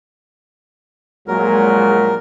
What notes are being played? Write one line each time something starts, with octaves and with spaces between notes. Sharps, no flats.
A#1 A#2 F#3 G#3 A#4